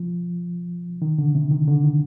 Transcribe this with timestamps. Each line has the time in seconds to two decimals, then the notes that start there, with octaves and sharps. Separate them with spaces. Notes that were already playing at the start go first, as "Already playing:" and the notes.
Already playing: F3
1.02 D#3
1.18 D3
1.35 C3
1.51 D#3
1.68 D3
1.84 D#3